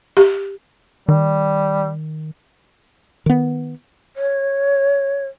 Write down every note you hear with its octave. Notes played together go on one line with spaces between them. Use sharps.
G4
D#3 G3
D#3 B3
C#5